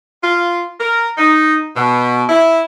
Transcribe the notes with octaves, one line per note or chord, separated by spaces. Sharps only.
F4
A#4
D#4
B2
E4